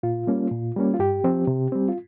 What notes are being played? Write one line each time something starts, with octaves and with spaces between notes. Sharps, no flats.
A#2 F4
G3 A#3 C#4
A#2
G3 A#3 C#4
F4
G2 G4
F3 C4
C3
G3 C4
F4